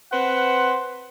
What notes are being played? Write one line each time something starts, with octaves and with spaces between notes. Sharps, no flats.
C4 B4 C5 F#5